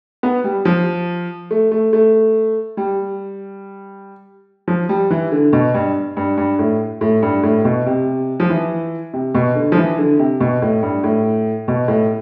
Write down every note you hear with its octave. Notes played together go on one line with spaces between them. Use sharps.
B3
G3
F3
A3
A3
A3
G3
F3
G3
E3
D3
B2
G2
G2
G2
A2
A2
G2
A2
B2
C3
F3
E3
C3
B2
D3
F3
E3
D3
C3
B2
A2
G2
A2
B2
A2